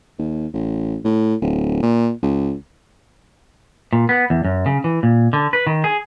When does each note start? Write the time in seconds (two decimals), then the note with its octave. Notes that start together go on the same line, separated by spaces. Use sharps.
0.19 D#2
0.54 A1
1.04 A2
1.42 D1
1.83 A#2
2.23 C#2
3.93 A#2
4.09 B3
4.30 E2
4.45 F#2
4.66 C#3
4.84 E3
5.03 A#2
5.33 D3
5.53 B4
5.67 D#3
5.84 G#4